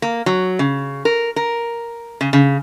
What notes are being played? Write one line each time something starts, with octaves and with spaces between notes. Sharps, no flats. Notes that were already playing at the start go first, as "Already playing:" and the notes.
A#3
F#3
C#3
A#4
A#4
C#3
C#3